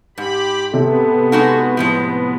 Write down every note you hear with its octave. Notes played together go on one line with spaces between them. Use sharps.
G#2 G4 B5
C3 B3 A4
G#3 D#4 F#4
A2 F3 G#3